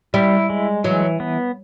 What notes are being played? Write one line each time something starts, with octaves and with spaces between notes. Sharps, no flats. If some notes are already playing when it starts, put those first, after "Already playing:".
G3 E4
G#3
E3 F#3
B3